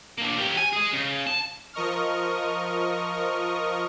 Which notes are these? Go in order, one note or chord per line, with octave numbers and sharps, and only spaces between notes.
A#3 D4
C#4 G4
G#5
G#4 D#5
C#3
A5
F3 A#4 D#5 C#6 D#6 F6